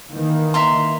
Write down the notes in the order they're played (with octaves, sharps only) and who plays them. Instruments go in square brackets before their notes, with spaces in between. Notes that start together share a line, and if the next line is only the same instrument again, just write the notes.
[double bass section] D#3 E3 A#3
[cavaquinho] E5 A#5 C6